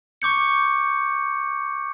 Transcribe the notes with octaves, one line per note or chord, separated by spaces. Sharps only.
C#6 D6 G6 C#7